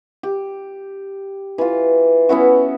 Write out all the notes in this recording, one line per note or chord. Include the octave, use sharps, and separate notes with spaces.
G4
E3 F4
B3 C#4 E4 F#4